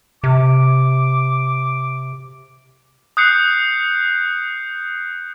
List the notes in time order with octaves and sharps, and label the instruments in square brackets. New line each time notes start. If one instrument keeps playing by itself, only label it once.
[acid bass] C3 [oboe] D6
[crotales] D#6 F#6 G6 C7 C#7